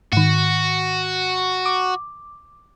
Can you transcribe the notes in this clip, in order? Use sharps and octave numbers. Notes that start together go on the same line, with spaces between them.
G#2 D#3 F#4
D6